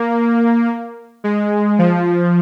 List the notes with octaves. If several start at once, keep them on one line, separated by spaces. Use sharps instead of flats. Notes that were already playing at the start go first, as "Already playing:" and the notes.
Already playing: A#3
G#3
F3